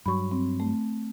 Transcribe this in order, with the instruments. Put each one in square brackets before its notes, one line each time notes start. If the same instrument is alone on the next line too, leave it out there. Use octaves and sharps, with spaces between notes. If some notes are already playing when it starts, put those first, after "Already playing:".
[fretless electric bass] G2 F#3 [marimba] B5 C#6
[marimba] C4
A3